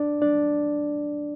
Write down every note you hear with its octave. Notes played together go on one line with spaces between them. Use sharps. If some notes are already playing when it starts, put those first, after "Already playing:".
Already playing: D4 D5
D4 D5